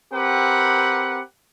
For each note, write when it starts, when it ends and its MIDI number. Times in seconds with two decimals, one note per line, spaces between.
0.13 1.22 60
0.13 1.22 67
0.13 1.22 70
0.13 1.22 71
0.13 1.22 78